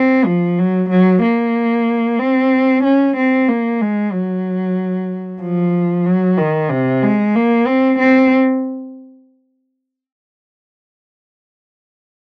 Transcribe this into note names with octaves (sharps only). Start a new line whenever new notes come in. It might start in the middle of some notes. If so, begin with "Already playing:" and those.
Already playing: C4
F3
F#3
F#3
A#3
C4
C#4
C4
A#3
G#3
F#3
F3
F#3
D#3
C3
G#3
A#3
C4
C4